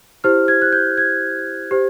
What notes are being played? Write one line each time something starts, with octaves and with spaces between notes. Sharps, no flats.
E4 G4 C5 F6
G#6
F#6
G6
G#6
G4 C5